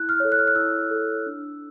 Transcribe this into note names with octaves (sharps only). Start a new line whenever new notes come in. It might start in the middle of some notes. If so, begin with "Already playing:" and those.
Already playing: E4 F#6
F6
A4 C#5
F#6
F6
F#6
E4 E6
A4 C#5
D4